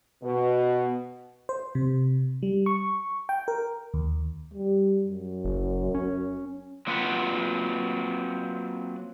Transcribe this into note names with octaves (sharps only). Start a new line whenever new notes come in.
B2
C5
C3
G3
C#6
G5
A#4
D#2
G3
F#2
F#1
C#4
F#3 A#3 C4 F4 B4 F#5